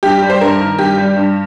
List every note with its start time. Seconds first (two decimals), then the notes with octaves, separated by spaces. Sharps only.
0.03 G2 G4
0.22 G3
0.30 C5
0.41 G2 A#4
0.60 D#3
0.79 G2 G4
0.98 G3
1.16 G2